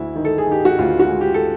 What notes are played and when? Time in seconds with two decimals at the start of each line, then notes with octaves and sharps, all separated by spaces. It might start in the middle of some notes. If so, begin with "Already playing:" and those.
Already playing: D2 E4
0.15 D#3
0.25 A4
0.38 G#4
0.47 D#3 G4
0.65 F#4
0.78 D2 F4
1.00 F#4
1.10 G#3
1.21 G4
1.34 A4